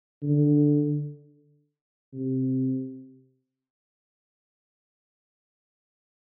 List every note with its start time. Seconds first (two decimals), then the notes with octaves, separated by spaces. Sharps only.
0.23 D3
2.13 C3